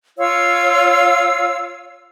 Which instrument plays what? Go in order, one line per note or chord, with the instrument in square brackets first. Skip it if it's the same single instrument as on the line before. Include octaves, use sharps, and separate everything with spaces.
[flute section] F4 C#5 F5 E6